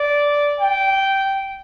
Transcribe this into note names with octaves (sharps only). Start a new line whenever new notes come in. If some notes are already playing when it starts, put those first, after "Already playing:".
Already playing: D5
G5